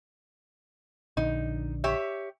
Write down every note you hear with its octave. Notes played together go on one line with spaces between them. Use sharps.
A#1 D3 D#4
G4 C#5 E5